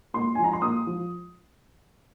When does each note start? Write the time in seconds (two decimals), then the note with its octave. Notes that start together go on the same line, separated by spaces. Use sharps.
0.14 A#2 C6
0.35 F3 G#5
0.44 A#5
0.53 C6
0.62 A#2 D#6
0.87 F3